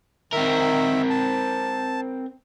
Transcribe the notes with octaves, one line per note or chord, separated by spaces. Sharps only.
D#3 C4 A#4 E5
A5